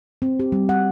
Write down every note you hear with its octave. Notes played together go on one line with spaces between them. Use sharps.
C4
G4
G3
F#5